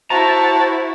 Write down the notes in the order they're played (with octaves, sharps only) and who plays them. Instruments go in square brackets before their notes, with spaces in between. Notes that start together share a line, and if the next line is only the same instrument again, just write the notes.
[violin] E4 F#4 [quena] C5 [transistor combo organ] A5 [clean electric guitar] A#5